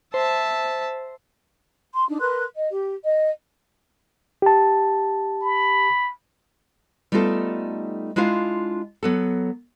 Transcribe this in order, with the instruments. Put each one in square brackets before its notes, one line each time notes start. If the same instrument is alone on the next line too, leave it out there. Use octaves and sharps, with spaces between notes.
[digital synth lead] C5 [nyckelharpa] E5 A5
[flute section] C6
D4 D#4
A#4 B4 C6 F#6
D#5
G4
D#5
[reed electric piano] G4 A5
[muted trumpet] B5
[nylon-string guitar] G3 A3 B3 D#4 F4 A4
G#3 D4 E4 F4 F5
F#3 B3 A4